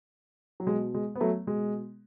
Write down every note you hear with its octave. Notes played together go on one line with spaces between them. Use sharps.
F#3
B2 G#3
G#3
B3
F#3 A3
B2 G#3